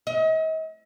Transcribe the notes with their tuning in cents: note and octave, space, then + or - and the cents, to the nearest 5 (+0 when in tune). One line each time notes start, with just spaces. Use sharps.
D#5 +40